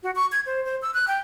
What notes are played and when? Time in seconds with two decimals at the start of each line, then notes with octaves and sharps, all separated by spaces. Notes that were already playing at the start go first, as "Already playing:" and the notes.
0.03 F#4
0.16 C#6
0.32 G#6
0.46 C5
0.65 C5
0.82 E6
0.94 F#6
1.08 G5